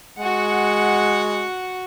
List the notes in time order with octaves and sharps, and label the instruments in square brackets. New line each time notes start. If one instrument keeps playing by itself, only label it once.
[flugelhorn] G#3 [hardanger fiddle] F#4 F#5